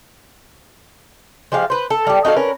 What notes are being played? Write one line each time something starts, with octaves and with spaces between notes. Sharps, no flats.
F3 G#3 G4 F5
B4 C5
A4
G3 G4
D#4 F#4 A4 F5
C#4 A#4 B4